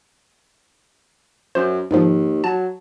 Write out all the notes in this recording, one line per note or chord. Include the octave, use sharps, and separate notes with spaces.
F#2 C5
D#2 G#2 D#3 F3
F#3 A5